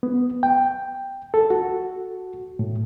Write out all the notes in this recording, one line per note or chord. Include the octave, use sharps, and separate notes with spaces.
B3
G5
A4
F#4
A2